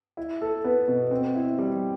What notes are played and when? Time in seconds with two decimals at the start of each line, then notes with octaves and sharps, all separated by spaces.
0.17 E4
0.42 A4
0.64 B3
0.88 B2
1.11 C4
1.35 E4
1.58 G3